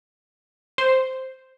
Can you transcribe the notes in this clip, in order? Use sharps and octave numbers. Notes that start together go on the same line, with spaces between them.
C5